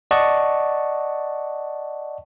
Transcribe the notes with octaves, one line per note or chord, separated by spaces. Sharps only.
D5 D#5 F#5 A5 C#6